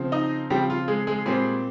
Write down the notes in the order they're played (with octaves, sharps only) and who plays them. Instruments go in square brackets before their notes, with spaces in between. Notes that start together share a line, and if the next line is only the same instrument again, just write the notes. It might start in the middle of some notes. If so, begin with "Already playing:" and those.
Already playing: [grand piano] C#3 F3 C4
D#4 D#5
C#3 F3 G3 C4 G4
F4
G#3 G#4
G#3 G#4
A#2 G3 G#3 C4 G#4